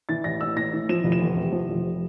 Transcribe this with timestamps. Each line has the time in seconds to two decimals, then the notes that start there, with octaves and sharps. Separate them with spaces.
0.09 E3 A6
0.24 A1 A#6
0.41 A1 E6
0.56 A2 A#6
0.73 E3
0.89 F3 E7
1.04 F1
1.12 E7
1.21 E2
1.37 C3
1.52 F3
1.69 F1